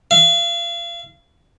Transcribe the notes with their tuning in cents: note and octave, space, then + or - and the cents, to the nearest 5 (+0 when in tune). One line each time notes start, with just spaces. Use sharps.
F5 -35